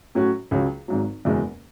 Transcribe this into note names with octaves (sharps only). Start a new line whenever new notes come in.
A2 F#3 C#4 F#4
C#2 C#3 F#3
G#1 G#2 F#3
F#1 E2 B2 G#3